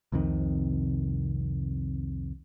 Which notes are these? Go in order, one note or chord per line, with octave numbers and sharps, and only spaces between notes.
C2 F2 C3 D#3